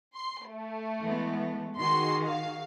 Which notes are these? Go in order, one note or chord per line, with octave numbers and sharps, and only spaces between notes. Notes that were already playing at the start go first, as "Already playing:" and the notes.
C6
A3
E3 G#3 B3
D#3 F#4 G#4 C6
F5